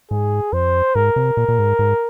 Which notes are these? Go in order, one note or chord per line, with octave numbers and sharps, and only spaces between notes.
G#2 G#4
F2 C5
G#2 A#4
C3
A#2
A#2
G#2
G#2